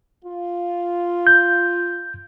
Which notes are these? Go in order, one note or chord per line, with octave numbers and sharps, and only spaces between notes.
F4
G6